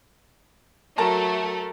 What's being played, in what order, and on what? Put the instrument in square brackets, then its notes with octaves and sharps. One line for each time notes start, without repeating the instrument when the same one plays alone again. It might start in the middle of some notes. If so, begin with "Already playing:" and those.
[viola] F#3 [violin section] A3 [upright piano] A#4 A5 A#5